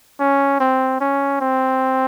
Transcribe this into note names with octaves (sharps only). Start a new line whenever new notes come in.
C#4
C4
C#4
C4